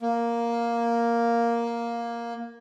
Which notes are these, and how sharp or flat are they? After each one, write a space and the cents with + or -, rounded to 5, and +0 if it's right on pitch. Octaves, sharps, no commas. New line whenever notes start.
A#3 +5